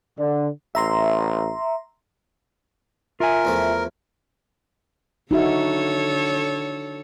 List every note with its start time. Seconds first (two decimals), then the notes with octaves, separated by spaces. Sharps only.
0.18 D3
0.75 A1 E5 A#5 C6
3.20 F4 A#4 E5 G#5
3.45 E2 F3 A3
5.31 D3 D#4 F#4 A4 C#5 E5